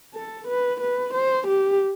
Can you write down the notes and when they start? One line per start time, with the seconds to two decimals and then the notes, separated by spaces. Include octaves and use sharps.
0.15 A4
0.48 B4
0.81 B4
1.14 C5
1.48 G4